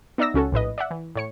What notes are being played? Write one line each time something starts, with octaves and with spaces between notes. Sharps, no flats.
B3 D#4 D5 E5 E6 A#6
C#2 C#4 F#4 A4
A#1 A2 B4 D#5
D5 E5 F#5
E3
A2 C#5 C#7